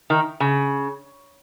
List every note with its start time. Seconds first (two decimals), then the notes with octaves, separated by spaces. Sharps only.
0.10 D#3
0.40 C#3